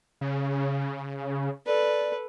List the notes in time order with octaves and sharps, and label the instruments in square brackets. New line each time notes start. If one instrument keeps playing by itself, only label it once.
[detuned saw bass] C#3
[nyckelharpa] A4 B4 [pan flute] D5